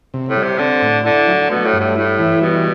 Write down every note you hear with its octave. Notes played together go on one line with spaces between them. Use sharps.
C3
A2
G3
C3
D3 C4
A2
D3 E4
F#3
B2 A3
A2
G2
A2
A2 E4
E3
B2 G3